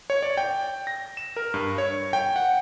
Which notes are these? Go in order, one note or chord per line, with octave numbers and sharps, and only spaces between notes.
C#5
D5
G5
A#6
E7
A#4
G2
C#5
G5
F#5